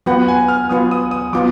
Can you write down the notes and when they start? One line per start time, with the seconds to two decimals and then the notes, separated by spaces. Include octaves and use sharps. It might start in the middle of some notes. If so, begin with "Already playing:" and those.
0.06 F#3 B3 F4 B4 F#5
0.28 G#5
0.48 F6
0.69 F#3 B3 F4 B4 D#6
0.91 D#6
1.11 D#6
1.33 F#3 B3 F4 D6